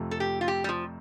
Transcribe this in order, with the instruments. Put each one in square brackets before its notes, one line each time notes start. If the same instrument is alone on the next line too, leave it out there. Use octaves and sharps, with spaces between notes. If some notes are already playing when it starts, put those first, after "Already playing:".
Already playing: [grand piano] F2 C3 A3
[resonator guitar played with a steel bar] A4
G4
F4
G4
G3
F3